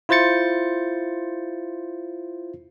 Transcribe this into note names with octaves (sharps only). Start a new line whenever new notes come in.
E4 F4 C5 G6 A6 C#7